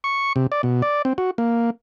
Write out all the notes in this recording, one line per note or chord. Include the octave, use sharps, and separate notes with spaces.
C#6
C3
D5
B2
D5
C4
F#4
A#3